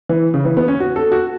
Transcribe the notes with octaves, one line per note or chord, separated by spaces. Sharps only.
E3
C#3
E3
B3
C#4
F#4
A4
F#4